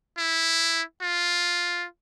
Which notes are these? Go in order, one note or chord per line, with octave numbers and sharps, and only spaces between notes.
E4
F4